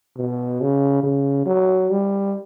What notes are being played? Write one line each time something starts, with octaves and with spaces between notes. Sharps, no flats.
B2
C#3
C#3
F#3
G3